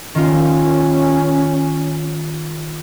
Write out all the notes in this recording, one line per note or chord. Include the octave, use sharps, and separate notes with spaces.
D#3 C#4 F4